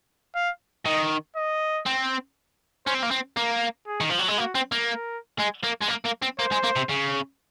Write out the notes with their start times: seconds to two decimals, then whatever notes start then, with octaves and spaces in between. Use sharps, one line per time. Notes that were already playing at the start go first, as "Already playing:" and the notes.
0.35 F5
0.85 D#3 D#5
1.36 D#5
1.86 C4
2.86 C#4 C5
2.95 C4
3.03 A#3
3.11 C4
3.37 A#3 A#4
3.87 G#4
4.00 D#3
4.10 F3
4.19 F#3
4.29 G#3
4.38 A#3 F#4
4.55 C4
4.72 A#3
4.88 A#4
5.39 G#3
5.64 A#3
5.82 G#3
5.89 A#3
6.05 A#3
6.22 C4
6.39 A#3 C5
6.52 G#3
6.64 A#3
6.77 C3
6.90 C#3